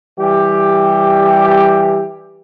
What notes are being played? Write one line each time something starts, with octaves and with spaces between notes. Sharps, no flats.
E3 G3 G4